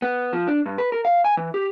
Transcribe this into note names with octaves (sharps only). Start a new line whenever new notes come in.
B3
F3
D4
G2
B4
A#4
F5
G#5
E3
G4